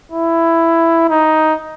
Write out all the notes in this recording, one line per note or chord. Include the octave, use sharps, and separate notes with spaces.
E4
D#4